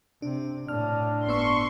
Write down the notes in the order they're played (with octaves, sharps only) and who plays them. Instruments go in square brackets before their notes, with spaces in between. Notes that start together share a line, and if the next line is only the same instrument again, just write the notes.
[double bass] C3 [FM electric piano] D4
[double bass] A2 [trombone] D4 [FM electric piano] F6
[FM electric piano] G1 B3 E6 [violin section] C6 C#6